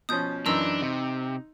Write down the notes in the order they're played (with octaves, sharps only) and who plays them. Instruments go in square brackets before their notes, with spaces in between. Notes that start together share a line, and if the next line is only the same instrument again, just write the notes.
[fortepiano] B2 F3 C#4 [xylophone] D#6 G6
[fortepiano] F#2 E3 D#4 [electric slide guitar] D4 [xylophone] C6 E6 F7
[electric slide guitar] C3 [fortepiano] D#4